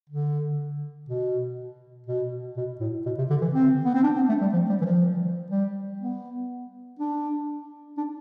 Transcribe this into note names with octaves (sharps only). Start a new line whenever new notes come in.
D3
B2
B2
B2
A2
B2
C3
D3
E3
C4
B3
C4
D4
C4
A3
G3
F3
G3
E3
F3
G3
B3
D4
D4